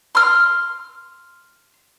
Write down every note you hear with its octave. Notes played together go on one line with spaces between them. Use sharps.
C6 F6